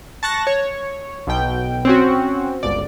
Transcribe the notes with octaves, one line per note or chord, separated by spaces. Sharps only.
A5 C#6 F#6 A#6
C#5
B1 B2 G5
C4 C#4 F#4
G1 C#2 D5